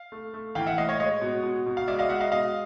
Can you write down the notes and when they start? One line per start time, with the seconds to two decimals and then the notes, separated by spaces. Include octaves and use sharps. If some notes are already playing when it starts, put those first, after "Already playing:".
Already playing: F5
0.12 A3
0.34 A3
0.55 E3 F5 G5
0.66 E5 F#5
0.78 A2 D#5 F5
0.89 C#5 D#5
1.00 G#3 C#5 D#5
1.22 B2
1.43 B2
1.66 B2
1.77 F5
1.88 G#3 D5 E5
1.99 D#5 F5
2.09 G#3 E5 F#5
2.20 D#5 F5
2.32 B2 D#5 F5